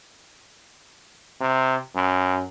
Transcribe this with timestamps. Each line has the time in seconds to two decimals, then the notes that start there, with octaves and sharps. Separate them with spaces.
1.41 C3
1.95 F#2